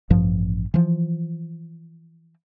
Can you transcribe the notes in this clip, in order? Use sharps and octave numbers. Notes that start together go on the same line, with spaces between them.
A1 G2 F3
E3 F3